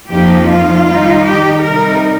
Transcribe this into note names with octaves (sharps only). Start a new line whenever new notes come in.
F2 F3 A#3 D#4 G4
F4
D#3 G3 D#4
G4
C3 G3 D#4 A#4